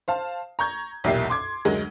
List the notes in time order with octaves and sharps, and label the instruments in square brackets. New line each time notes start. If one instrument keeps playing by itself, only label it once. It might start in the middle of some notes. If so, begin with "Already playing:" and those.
[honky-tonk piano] C5 F5 A5
A#5 C#6 G6 G#6
B1 E2 A#2 G4 E5 C7
C6 D6 G#6
D2 F#3 G#3 G#4 A#4